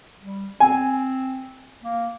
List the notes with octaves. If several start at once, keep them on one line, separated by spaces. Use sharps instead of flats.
G3
C4 G#5
A#3